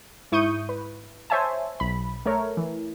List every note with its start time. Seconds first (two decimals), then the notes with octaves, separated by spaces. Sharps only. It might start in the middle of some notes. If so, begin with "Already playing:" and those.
0.32 G#2 E4 C#6 D#6 G6 D#7
0.69 B4
1.30 C5 C#5 E5 G#5 A5
1.80 B1 B5
2.26 A3 A#4 C#5
2.57 E3